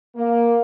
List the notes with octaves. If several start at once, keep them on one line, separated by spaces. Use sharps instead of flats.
A#3